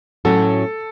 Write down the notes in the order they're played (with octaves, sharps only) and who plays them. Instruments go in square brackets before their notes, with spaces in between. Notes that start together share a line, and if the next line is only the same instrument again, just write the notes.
[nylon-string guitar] A2 F#3 C#4 F#4 [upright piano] A4